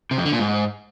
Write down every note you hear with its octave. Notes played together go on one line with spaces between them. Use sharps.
C3
F2
D3
A#2
G#2